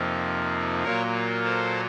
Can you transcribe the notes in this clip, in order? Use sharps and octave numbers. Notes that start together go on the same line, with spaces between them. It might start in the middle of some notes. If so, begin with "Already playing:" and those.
Already playing: F2 C3 F3 A#3 D#4
A#2 F#3 A#3 F4 A#4 C#5
A4 C5